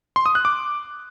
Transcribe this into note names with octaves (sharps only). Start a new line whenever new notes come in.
C6
D#6
F#6
D6